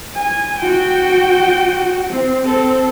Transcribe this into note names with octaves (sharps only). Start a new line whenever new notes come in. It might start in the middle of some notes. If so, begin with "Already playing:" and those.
G#5
F#4 G5
C4
C4 A4